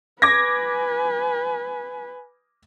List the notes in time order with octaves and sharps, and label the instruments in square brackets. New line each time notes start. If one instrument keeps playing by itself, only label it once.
[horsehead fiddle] B4 G#5 [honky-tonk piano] D6 G#6 A#6